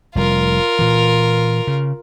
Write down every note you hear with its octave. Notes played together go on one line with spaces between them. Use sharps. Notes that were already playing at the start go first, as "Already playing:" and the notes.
F1 G3 F4 A#4
A#2 E3
C#3